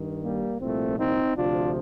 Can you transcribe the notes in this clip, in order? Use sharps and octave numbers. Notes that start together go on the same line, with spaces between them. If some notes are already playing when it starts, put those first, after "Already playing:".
Already playing: G2 D#3
G3 A#3
C2 A#2 F3 A3 C4
C4 D#4
D2 C3 F3 D4 F4